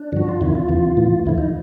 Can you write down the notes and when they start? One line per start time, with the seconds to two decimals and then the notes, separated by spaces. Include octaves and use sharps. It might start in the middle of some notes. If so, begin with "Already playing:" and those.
Already playing: D4
0.12 G2 D3 F3 F#4
0.29 F4
0.41 E2 C3 D#3 E4
0.55 F4
0.69 E2 C3 E3
0.97 A2 E3
1.26 D#2 D3 F3 E4
1.38 D#4